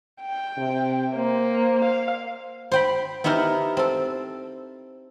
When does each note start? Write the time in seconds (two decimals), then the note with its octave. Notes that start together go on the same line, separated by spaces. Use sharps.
0.22 G5
0.57 C3
1.14 A#3 C5
1.85 F5
2.72 C5 G5 B5
3.24 B3 D#4 E4 G4 A#4
3.77 C4 A4